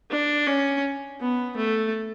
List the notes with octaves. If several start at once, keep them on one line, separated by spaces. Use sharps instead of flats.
D4
C#4
B3
A3